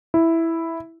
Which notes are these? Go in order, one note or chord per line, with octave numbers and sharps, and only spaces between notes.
E4